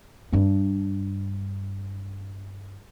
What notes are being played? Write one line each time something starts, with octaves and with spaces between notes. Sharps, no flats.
G2 D4